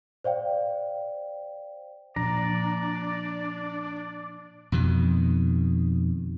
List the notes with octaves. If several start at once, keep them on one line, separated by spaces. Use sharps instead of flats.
C5 D5 F5 G5
A#2 F3 D4 D5 A#5
F2 B2 D#3